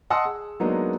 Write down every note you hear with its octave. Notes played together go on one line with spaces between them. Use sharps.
D#5 F#5 A5 C6 D#6 E6
G#4
F#3 G#3 A#3 B3 D4 D#4